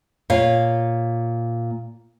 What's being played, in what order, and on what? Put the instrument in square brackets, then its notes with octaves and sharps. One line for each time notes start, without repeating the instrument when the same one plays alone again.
[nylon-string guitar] A#2 C#5 F5